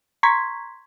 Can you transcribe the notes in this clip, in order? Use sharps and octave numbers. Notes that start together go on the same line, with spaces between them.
A#5 C6 C#6 G#6 B6